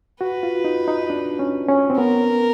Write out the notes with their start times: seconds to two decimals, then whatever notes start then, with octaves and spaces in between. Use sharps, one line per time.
0.21 F#4 B4
0.43 F4
0.65 D#4
0.88 D#4
1.10 D4
1.39 C#4
1.69 C#4
1.90 C4
1.98 B3 A#4